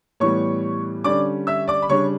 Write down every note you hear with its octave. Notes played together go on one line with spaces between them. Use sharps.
A2 E3 G3 B3 C#5 C#6
D3 G3 C#4 D5 D6
E5 E6
D5 D6
B5
C#3 G3 D4 C#5 C#6